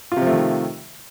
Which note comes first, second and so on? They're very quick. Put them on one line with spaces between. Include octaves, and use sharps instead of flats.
F4 C3 F3 A3 D#3